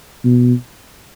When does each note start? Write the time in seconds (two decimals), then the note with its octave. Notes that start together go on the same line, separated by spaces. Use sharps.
0.24 B2